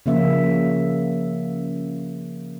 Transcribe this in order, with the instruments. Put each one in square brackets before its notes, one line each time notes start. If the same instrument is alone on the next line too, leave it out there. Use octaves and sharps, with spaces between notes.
[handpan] C#3 F3 A#3 C#4 E5